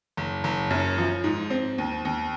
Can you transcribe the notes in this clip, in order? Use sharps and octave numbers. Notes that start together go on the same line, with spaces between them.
F#1
F#1
F#2
F3
G#2
C4
D#2
D#2